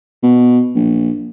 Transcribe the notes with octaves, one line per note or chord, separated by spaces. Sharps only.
B2
A#1